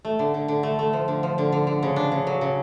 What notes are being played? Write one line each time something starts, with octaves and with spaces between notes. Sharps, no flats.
A3
D3
D3
D3
A3
A3
F3
D3
F3
D3
D3
D3
C#3
D4
C#3
F#3
C#3